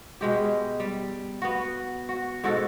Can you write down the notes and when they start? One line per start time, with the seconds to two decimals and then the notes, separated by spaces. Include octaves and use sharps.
0.21 B2 G#3 G4
0.80 G3
1.42 B3 F#4
2.09 F#4
2.44 G#2 B2 F#4 A4